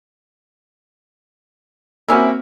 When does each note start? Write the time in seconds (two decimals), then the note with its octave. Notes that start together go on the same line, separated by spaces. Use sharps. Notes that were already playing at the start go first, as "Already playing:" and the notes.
2.08 G3 A#3 C4 C#4 E4 F#4